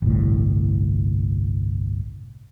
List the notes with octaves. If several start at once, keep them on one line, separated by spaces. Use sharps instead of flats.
G1 C2 A2